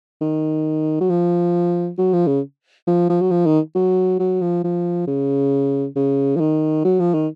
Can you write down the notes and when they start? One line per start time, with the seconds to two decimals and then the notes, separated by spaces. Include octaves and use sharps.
0.21 D#3
1.01 F#3
1.10 F3
1.98 F#3
2.13 F3
2.27 C#3
2.87 F3
3.10 F3
3.21 F#3
3.31 F3
3.46 D#3
3.75 F#3
4.19 F#3
4.41 F3
4.64 F3
5.07 C#3
5.96 C#3
6.36 F3
6.40 D#3
6.85 F#3
7.00 F3
7.14 D#3